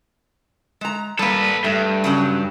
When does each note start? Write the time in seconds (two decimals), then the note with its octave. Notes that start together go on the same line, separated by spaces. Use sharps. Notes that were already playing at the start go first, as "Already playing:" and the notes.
0.81 G#3 A#5
1.19 G3 A#3 A4 B4
1.64 G2 A3
2.04 C#3 F#3 C#4